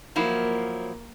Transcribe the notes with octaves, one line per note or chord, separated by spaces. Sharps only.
F3 F#3 A#3 E4